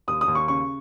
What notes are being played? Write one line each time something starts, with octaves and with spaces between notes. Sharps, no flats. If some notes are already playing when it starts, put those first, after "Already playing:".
D#2 D#6
D#6
D#2
C#6
C#3 C#6